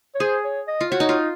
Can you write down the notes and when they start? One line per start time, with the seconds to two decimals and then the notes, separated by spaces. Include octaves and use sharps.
0.15 C#5
0.20 G#4 C5
0.44 C#5
0.68 D#5
0.81 F4
0.91 F#4 C#5
1.00 D#4
1.09 F4